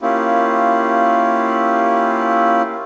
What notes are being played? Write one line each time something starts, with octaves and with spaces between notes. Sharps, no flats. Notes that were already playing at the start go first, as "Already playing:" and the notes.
A#3 C#4 E4 F4 G4